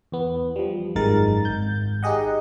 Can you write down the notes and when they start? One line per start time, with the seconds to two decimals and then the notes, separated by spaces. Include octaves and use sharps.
0.12 E2 B3
0.56 F3 G3
0.95 G#1 F#2 D#3 G#3 A#4 A6
1.45 G#1 G6
2.03 D#4 G4 G#4 D#5 F#5